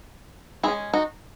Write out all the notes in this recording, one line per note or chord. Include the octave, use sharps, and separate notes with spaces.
G#3 C#4 E4 G#4
D#4 F#4